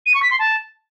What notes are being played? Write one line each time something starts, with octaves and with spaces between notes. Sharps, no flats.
D#7
C#6
B6
C6
A5